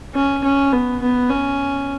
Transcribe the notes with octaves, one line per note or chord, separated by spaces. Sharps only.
C#4
C#4
B3
B3
C#4